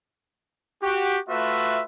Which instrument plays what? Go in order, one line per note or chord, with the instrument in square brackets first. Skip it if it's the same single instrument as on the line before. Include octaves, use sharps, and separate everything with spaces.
[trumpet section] F#4 G4
A3 F4 F#4 B4 E5